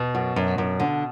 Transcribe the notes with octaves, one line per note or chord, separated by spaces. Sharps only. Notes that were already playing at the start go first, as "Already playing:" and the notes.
Already playing: B2
F#2
F#2
F#2
D3